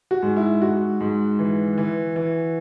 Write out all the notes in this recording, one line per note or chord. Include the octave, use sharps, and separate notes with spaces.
F#4
G#2
E4
G#2 F#4
G#2
E3
E3
E3